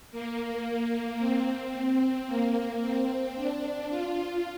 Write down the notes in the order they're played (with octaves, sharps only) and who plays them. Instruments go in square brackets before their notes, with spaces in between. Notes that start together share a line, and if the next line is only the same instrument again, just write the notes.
[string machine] A#3
C4
A#3
C4
D4
F4